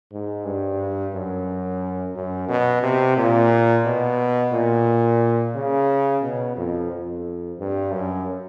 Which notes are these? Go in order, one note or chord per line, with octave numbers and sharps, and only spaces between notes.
G#2
G2
F#2
F#2
B2
C3
A#2
B2
A#2
C#3
B2
F2
F2
G2
F#2